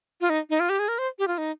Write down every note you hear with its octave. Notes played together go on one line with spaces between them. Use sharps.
F4
D#4
D#4
F4
G4
G#4
A#4
C5
G4
F4
D#4